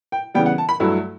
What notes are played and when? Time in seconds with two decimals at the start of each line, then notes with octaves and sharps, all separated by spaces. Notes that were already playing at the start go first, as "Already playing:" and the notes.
0.12 G5
0.34 C#3 E3 G3 B3 G5
0.46 F#5
0.58 A5
0.69 B5
0.80 G2 F#3 A3 E4